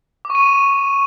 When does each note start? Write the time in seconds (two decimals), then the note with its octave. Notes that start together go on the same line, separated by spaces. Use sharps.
0.25 D6
0.30 C#6
0.35 D#7